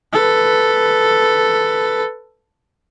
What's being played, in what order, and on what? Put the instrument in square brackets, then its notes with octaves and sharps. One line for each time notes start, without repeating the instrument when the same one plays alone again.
[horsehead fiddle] A4 B4